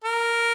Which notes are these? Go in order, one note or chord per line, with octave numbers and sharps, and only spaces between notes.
A#4